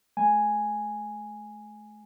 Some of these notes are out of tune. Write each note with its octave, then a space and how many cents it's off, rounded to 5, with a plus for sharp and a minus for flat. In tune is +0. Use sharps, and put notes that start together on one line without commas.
A3 -40 G#5 +0